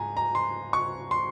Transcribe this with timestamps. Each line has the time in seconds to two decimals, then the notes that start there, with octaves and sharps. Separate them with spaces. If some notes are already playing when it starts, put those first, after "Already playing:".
Already playing: G#2 G#5 A#5
0.17 A#5
0.35 C6
0.73 C#6
1.11 C6